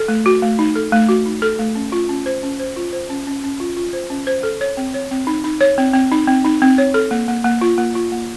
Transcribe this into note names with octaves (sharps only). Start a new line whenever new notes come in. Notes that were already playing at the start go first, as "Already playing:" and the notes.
Already playing: A4
A3
F#4
A3
D#4
A4
A3
F#4
D#4
A4
A3
C#4
F4
C#4
C5
C#4
C5
F4
C5
C#4
C#4
C#4
F4
F4
C5
C#4
C5
A4
C#5
C4
C#5
C4
D#4
D#4
C#5
C4
C4
D#4
C4
D#4
C4
C#5
A4
A#3
A#3
A#3
F4
A#3
F4
A#3